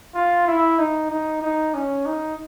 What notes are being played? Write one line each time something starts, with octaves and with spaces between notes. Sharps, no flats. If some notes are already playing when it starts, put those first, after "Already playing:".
F4
E4
D#4
D#4
D#4
C#4
D#4